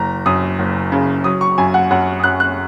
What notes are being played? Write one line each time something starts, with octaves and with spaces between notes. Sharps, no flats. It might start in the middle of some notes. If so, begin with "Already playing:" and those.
Already playing: F#1 A#5
F#2 D#6
F#1
C#3
F#3 D#6
C#6
F#2 G#5
F#5
F#2 F#5
D#6
F#2 F#6
F#6